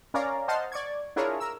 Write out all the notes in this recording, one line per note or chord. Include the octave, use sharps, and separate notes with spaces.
C#4 A#4 C#5 D5 F5 A#5
C5 D#5 F#5 A5 C6 F6
D5 C#6 G#6
D4 E4 F4 G#4 A#4 C#5
A#4 E6